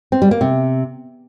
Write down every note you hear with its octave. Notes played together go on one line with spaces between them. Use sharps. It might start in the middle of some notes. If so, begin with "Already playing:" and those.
C4
G3
A#3
C3